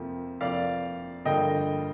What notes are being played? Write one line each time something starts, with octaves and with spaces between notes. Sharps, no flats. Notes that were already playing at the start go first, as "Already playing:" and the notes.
Already playing: F2 C3 F3 A#3
F2 C3 F3 A#3 D5 F5
G1 G2 D3 F3 A#3 D#5 G5